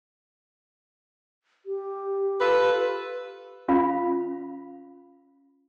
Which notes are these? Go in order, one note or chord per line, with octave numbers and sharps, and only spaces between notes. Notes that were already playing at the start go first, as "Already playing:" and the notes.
G4
F4 A4 B4
C#4 F4 F5 B5